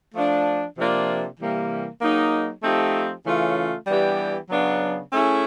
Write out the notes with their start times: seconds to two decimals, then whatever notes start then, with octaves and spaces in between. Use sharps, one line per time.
0.14 F3 A3 D4
0.76 C3 F3 A#3 D4 F4
1.38 C3 E3 G3 A#3
2.00 F#3 A#3 D#4 G#4
2.62 F3 A3 C4 D#4 G4
3.24 C#3 E3 A3 C#4 F4
3.87 E3 G3 B3 D4 G4
4.49 C#3 F#3 B3 D4
5.11 A3 C#4 E4 G#4